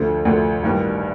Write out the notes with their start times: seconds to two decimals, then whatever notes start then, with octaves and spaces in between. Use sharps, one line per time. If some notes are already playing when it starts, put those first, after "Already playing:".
Already playing: D2 D3 F3 A3
0.25 D2 D3 F3 A3
0.63 A1 G2 D#3 G3